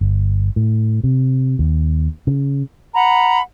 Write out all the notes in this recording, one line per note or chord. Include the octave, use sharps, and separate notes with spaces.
G1
A2
C3
D#2
C#3
F#5 A#5 B5